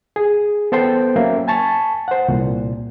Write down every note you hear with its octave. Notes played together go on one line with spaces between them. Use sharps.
G#4
B3 A4 C5 G5
F#3 A#3 C#4 E5
G#5 A5 C#6
C5 F#5
C2 A#2